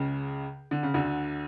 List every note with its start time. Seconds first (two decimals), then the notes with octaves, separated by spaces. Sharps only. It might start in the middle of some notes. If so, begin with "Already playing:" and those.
Already playing: C#2 C#3
0.71 D3
0.83 C#3
0.94 D2 D3